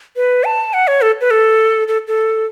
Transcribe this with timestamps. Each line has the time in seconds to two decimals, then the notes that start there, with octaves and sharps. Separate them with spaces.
0.16 B4
0.44 A5
0.73 F#5
0.88 C#5
1.02 A4
1.21 B4
1.31 A4
1.88 A4
2.08 A4